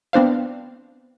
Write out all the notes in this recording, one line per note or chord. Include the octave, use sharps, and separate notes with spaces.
B3 C4 D4 C5 F5